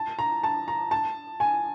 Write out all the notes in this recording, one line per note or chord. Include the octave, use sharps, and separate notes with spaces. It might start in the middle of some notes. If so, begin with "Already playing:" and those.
Already playing: A5
A#5
A5
A#5
A5
G#5